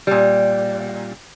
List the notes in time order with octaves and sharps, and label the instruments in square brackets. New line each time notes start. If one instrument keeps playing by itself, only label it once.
[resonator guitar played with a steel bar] A#2 G3